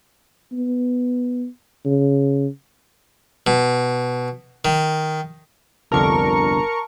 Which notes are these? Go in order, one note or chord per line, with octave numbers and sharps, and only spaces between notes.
B3
C#3
B2
D#3
G1 C2 F2 D3 A#4 A5 C#6